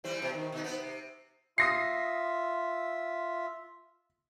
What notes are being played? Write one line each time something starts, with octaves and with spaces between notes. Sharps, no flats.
E3 G3 C4
G2 B2
D#3
B2 D#4
B3 C4
C3
F4 E5 D#6 A#6 C7